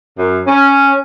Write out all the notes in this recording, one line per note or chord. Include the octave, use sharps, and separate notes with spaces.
F#2
C#4